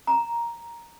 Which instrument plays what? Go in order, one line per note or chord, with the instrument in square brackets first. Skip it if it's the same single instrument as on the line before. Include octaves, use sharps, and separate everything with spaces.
[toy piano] A#5